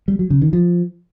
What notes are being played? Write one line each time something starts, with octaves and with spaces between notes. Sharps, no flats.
G3
F#3
C#3
D#3
F3